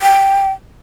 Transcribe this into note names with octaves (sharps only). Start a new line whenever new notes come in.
G5